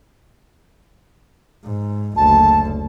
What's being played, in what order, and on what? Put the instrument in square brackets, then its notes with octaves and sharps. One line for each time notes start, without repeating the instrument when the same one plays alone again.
[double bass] G#2
[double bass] F#1 D2 [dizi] A5